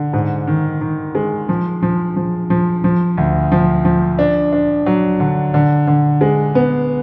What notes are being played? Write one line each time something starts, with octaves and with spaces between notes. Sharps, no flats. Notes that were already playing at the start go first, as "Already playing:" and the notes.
Already playing: D3
G#2
D#3
D#3
G#3
F3
F3
F3
F3
F3
D2
F3
F3
D4
D4
F#3
D3
D3
D3
G#3
B3